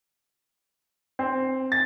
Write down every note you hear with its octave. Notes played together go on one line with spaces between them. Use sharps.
C4
A6